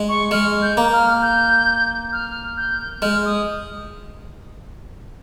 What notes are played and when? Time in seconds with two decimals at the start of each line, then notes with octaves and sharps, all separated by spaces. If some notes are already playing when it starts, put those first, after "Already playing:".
Already playing: G#3
0.09 C#6
0.31 G#3 F6
0.62 G6
0.77 A#3
0.93 F6
1.22 G6
2.12 F6
2.57 G6
3.02 G#3 F6
3.25 D#6